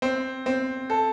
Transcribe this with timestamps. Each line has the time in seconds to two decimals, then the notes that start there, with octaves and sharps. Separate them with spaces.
0.02 C4
0.46 C4
0.90 A4